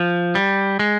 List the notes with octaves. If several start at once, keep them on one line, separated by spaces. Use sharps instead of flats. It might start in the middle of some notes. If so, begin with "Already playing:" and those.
Already playing: F3
G3
G#3